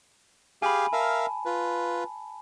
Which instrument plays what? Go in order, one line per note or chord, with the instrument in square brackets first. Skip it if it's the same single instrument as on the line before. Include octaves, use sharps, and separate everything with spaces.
[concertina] G4 G#4 F5 [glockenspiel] G#5 B5
[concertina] A#4 E5 F5 [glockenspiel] A5
[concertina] F4 B4